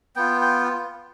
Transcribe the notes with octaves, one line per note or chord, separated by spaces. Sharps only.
B3 F4 G5
G5